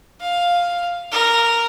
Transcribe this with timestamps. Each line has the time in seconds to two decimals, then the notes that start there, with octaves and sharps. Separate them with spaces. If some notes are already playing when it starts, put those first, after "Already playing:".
0.20 F5
1.12 A#4